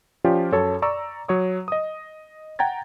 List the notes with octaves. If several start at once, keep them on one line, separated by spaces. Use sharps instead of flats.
F3 C#4 F4 G4 D5
F#2 A4 C#5 A5
D5 A#5 C#6 E6
F#3 C#5 D#6
D#5 D#6
F#5 G5 A#5 G#6 A6